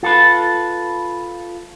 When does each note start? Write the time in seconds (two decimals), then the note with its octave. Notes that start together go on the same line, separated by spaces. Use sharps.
0.03 F4 A4 B4